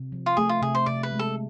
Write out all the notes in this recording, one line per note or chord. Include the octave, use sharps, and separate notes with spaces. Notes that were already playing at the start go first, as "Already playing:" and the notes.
Already playing: C3
F3
F4
A3 G#4
F4
C3 G#4
C5
C3 D5
B4
G#3
A4